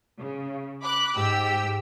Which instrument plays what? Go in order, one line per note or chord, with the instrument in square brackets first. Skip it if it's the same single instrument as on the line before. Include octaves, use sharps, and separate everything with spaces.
[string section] C#3
B5 D6 F#6
[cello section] G#2 G4 [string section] G5 E6